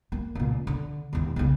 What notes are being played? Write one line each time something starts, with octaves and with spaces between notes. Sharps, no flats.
A#3
C#2 A#2
D3
E1 D#2
B1 C#3